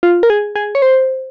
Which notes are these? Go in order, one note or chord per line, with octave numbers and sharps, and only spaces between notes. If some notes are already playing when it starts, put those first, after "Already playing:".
F4
A#4
G#4
G#4
C#5
C5